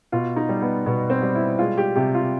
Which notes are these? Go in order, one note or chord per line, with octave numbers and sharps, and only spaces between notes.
B2 F4
D#4
G3
B3
B2 B3
C4
G3
E4
G#3 F4
G4
C3 G4
F4